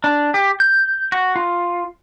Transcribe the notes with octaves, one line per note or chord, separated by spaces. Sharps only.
D4
G4
G6
F#4
F4